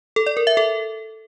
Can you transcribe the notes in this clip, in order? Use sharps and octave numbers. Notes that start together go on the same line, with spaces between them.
A4
D5
A#4
E5
A4